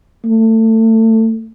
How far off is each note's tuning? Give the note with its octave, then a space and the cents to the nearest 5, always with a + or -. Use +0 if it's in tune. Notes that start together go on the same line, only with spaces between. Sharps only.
A3 +25